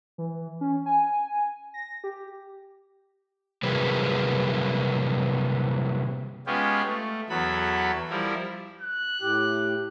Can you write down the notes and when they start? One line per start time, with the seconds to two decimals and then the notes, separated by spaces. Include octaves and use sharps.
0.18 E3
0.61 C#4
0.86 G#5
1.74 A#6
2.04 G4
3.63 C3 F#3 G3 A#3 G#4 B4
6.46 G#3 B3 C#4 F4 G4 G#4
6.86 A3
7.29 E2 F#3 B3 A4 B5
8.10 F3 G3 E4 A#4
8.82 F#6
9.21 A2 G4